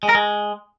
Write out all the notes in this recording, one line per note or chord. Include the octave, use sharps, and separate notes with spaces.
G#3
A#4
G#3